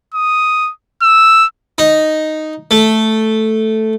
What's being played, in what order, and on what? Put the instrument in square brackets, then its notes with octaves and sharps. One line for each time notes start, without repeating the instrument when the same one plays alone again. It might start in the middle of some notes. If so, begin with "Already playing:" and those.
[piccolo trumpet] D#6
E6
[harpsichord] D#4
A3